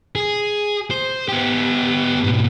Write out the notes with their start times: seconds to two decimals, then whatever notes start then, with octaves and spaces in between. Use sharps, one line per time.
0.15 G#4
0.91 C5
1.28 B3 G4
2.24 G#2 B2